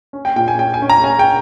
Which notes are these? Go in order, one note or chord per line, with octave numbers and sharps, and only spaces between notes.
C#4
G5
A#2 G5
G#5
C#4 G5
G#5
C#4
A#5
C#4 G#5
G5